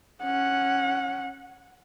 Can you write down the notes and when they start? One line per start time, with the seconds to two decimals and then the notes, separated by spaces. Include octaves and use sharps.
0.23 C#4 F#5